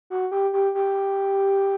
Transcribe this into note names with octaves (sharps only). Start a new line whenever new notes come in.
F#4
G4
G4
G4